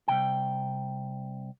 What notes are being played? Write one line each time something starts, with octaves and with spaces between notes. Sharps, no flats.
C2 F#2 C3 G5